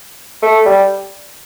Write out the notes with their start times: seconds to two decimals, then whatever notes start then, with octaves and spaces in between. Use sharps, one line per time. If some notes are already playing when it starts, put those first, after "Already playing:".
0.42 A3
0.66 G3